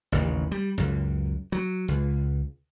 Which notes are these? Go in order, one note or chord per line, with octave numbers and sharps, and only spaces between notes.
A1 D#2 C#3
G3
C#2 F#2
F#3
C#2